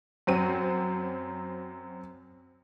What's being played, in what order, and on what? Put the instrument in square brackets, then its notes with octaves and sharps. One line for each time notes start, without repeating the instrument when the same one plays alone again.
[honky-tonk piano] F#2 F#3 C4 D#7